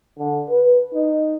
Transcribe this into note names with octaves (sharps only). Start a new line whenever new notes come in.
D3
B4
D#4